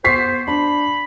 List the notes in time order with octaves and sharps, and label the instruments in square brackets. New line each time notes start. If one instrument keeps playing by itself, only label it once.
[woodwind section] B3 C5 [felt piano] C#6 B6 C7
[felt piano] D4 [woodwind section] B5